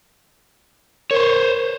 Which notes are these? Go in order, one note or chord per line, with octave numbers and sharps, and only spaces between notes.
A#4 C5 C#5 G#6